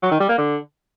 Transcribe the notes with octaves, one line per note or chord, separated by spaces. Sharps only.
F#3
D#3
G3
A#3
D3